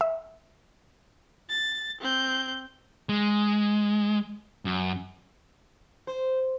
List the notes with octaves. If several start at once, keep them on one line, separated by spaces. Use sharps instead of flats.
E5
A6
C4 G6
G#3
F#2
C5